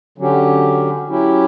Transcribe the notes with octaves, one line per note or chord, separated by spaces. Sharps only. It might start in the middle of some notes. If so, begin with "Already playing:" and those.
D3 F#3 C#4 G4
F#3 C#4 E4 G4